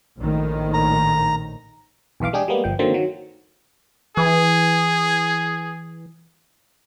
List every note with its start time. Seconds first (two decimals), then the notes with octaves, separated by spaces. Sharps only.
0.18 A#1 A2 D#3
0.74 A#5
2.20 B1 E2 E3 F5 D6
2.33 G#3 D4 G4 G#4
2.48 G3 G#3 A#3 B3
2.64 G1 F3 G5
2.79 D3 D#3 F#3 A#3 C4
2.94 D#3 F#3
4.17 E3 G#4